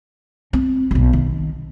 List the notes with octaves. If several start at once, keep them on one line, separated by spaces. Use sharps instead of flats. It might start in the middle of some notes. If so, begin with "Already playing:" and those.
C4
E1 B1
D#3